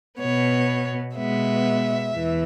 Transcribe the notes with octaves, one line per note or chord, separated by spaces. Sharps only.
B2 B3 C#5
B2 G#3 B3 E5
E2 E3